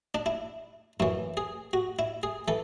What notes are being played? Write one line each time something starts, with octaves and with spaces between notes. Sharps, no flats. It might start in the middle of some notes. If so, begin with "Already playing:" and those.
D4
E4
F#2 E3 E4
G#4
F#4
E4
G#4
E3 A4